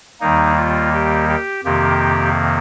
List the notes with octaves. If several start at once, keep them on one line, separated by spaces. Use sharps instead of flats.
D#2 D#3 G3 A#3 D#4
F4
G4
G4
F2 C3 D#3 A#3 G4